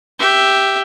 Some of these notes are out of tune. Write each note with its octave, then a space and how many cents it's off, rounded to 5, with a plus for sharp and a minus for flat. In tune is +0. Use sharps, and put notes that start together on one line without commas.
G4 +0 E5 +0